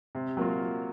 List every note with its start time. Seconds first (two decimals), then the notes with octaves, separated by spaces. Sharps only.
0.15 C3
0.37 F#3 A#3 F4